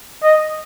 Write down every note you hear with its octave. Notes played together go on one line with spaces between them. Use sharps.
D#5